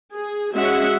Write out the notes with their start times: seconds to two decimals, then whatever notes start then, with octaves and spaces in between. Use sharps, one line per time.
0.15 G#4
0.54 G#3 C#4 F#4 E5 F#5